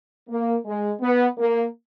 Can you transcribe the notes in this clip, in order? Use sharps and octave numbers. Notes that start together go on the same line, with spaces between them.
A#3
G#3
B3
A#3